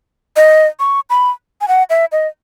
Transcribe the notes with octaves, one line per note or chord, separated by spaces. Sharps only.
D#5
C#6
B5
G#5
F#5
E5
D#5